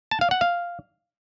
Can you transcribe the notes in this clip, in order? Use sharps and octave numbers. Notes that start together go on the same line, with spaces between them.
A5
F5
F#5
F5